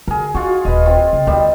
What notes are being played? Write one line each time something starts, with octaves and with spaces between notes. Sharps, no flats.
D3 G#4 A#4
D#4 F4 F#4
D#1 B4 D#5
C4 F4
C#3
D2 D#3 G3 D#4